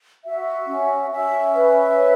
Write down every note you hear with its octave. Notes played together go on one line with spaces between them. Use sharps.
F#4 E5
C#4
C#4 E5
B4
C#5